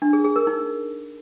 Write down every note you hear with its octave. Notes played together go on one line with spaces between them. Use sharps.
D4
G#4
G#4
A#4
D#4